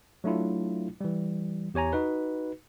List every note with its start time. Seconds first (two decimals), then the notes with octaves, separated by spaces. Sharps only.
0.24 F#3 A3 D4 E4 F4
1.01 E3 G3
1.74 E2 G4 C#5 G#5 A#5
1.93 D#4 F#4 B4